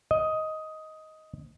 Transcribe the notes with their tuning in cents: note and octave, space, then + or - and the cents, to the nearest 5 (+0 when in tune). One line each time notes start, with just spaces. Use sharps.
D#5 +10